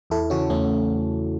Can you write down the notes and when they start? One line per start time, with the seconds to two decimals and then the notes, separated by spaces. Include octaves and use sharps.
0.10 E2 E4 A4
0.30 C#3 E3 C#4 F#4
0.50 E2 A3 C#4